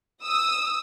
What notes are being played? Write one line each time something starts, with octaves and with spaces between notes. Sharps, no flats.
D#6 E6